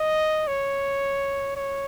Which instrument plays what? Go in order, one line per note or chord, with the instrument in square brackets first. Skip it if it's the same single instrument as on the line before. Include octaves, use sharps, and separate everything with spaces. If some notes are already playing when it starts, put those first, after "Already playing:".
Already playing: [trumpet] D#5
C#5
C#5